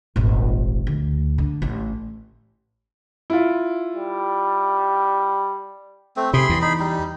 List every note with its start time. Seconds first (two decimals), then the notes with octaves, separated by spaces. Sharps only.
0.16 D#1 G#1
0.87 D2
1.38 D3
1.62 A1
3.30 E4 F4
3.95 G3
6.17 A3 C4
6.34 C3 G#4 B5 C6
6.49 E2
6.62 D#4 G#4 B5
6.80 G3 D#4